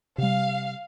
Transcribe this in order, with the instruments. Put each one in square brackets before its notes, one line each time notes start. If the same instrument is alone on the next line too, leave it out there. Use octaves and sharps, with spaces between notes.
[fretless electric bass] C3 G3 [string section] F5